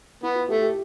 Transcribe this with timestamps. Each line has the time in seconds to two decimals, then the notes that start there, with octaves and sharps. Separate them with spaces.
0.23 B3 E4
0.36 F4
0.49 A3 G4
0.62 G4